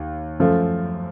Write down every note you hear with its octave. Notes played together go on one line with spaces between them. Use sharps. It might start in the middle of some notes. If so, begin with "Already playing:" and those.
Already playing: D#2
F#2 F3 A3